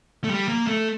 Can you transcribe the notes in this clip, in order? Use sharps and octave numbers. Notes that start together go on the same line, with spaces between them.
A3
G3
A#3
A3